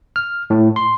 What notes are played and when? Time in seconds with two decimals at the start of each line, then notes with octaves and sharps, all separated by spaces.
0.16 F6
0.50 A2
0.76 C6